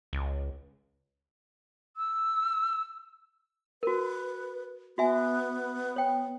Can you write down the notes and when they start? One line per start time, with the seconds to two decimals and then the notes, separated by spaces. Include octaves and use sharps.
0.13 C#2
1.97 E6
3.83 F#4 A#4 B4
4.98 B3 F#4 E5 G#5
5.96 C#5 G5